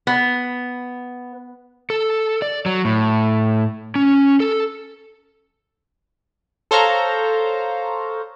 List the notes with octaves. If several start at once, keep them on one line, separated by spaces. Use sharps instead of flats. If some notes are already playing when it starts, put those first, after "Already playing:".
B3
A4
D5
F#3
A2
C#4
A4
A4 C5 C#5 F5 A#5